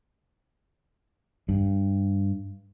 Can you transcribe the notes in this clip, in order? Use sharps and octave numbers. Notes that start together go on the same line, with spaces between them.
G2